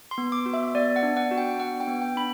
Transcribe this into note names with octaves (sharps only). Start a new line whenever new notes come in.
C6
B3
D6
F#4
E5
B3 D5
F#5
D4
F#5
F#4
G5
B3 F#5
G5
B3
G5
D4 B5